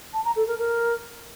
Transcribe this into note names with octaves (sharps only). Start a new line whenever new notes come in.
A5
A#5
A4
A#4
A#4